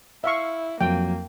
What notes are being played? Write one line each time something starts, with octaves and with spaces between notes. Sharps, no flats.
E4 E5 F5 C#6
F2 F#3 A#3 G5